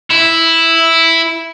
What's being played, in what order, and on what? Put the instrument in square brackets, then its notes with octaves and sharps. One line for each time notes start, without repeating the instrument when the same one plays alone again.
[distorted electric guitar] E4